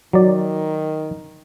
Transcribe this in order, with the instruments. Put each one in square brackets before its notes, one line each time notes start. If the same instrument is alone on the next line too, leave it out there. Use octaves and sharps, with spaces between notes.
[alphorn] D#3 [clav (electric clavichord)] F#3 D5